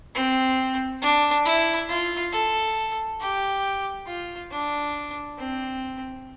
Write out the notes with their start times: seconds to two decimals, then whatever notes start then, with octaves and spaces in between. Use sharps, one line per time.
0.15 C4
1.02 D4
1.45 E4
1.88 F4
2.33 A4
3.20 G4
4.07 F4
4.51 D4
5.38 C4